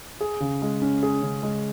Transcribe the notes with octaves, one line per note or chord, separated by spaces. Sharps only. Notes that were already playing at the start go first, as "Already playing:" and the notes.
G#4
C#3
G#3
C#4
G#4
C#3
G#3